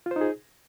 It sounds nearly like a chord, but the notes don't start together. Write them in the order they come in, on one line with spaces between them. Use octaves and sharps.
F4 C5 D#4 G#4